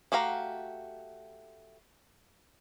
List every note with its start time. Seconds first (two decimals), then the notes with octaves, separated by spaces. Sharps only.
0.12 A3 F#4 G4 F5 A#5